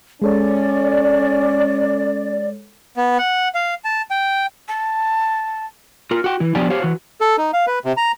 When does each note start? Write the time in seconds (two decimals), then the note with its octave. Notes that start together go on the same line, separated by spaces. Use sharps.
0.22 G#3 C#4 A4 C#5 D5
2.97 B3
3.19 F#5
3.55 F5
3.85 A5
4.11 G5
4.68 A5
6.11 F4 A#4
6.24 F#4 G5
6.40 E3 E4
6.55 F3 B3 D4 G4 D5 G#5
6.70 G4 C5 C#5 F5
6.82 E3 F#4
7.21 A4
7.37 D#4
7.53 F5
7.67 B4
7.85 C3
7.97 A#5